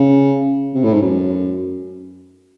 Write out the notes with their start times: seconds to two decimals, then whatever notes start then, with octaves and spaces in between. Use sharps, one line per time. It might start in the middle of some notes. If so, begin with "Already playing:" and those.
Already playing: C#3
0.75 C3
0.83 A2
0.93 G#2
1.02 F#2